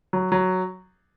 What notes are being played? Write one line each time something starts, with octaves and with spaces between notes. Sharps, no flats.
F#3
F#3